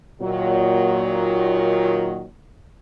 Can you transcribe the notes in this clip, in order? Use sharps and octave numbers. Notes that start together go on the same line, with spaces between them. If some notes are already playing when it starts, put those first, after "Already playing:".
A#2 D#3 F#3